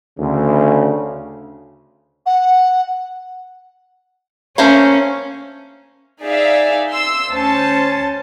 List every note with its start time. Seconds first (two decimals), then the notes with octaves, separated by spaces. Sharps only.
0.19 D2 C#3
2.26 F#5
4.58 A3 A#3 C#4 C5
6.24 D#4 G#4 D5 E5 F5
6.92 C6 E6
7.29 D2 C#4 C5 A5